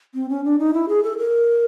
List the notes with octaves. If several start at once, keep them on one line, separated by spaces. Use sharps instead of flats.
C4
C#4
D4
D#4
E4
G#4
A4
A#4